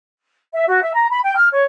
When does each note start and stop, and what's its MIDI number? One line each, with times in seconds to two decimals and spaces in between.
0.52 0.64 76
0.67 0.80 66
0.81 0.90 76
0.94 1.06 82
1.09 1.18 83
1.22 1.34 79
1.35 1.46 89
1.52 1.63 73